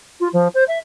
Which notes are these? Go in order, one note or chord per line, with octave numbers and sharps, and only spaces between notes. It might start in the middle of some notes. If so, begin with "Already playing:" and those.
F4
F3
C5
E5